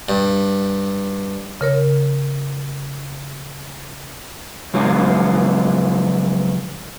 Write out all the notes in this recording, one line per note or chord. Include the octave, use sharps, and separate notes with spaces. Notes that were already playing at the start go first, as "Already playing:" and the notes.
G2
C#3 A#4 C#5
C#3 F3 F#3 G#3